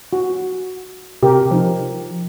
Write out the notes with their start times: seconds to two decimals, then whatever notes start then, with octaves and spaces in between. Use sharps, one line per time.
0.13 F#4
1.23 C3 G4 A#4
1.51 F3 D#4 A#4